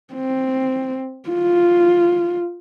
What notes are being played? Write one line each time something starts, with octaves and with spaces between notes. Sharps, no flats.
C4
F4